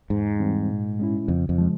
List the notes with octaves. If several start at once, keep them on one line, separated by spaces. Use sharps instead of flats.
E2 G#2
E3 G3 C4
A#2
G#3 C#4 E4
F2 C#3
F2
F3 G#3